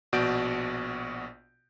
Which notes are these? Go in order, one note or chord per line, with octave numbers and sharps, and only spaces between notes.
A#1 B2 F#4 D5 G6 D7